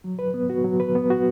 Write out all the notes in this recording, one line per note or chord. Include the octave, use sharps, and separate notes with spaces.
F#3
B4
B3
F#4
F#3
B4
B3
F#4